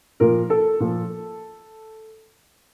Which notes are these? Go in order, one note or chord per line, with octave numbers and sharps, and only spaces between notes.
A#2 F3 A#4
A4
A#2 F3